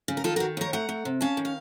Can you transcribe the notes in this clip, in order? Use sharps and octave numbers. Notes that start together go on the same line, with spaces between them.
C#3
A#4
D#3 F4 A4
D#3 F#4 A#4
D#2 A#4 C#5
A3 F#5 A#5
A3
C3
C#4 F5 A5
D#3
F5